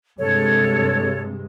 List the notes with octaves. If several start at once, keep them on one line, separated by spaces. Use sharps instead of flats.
G2 C3 G#3 A4 C#5